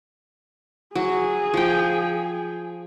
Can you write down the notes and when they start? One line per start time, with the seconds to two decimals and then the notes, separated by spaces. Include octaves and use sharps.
0.95 F#3 G#4
1.54 F3 G5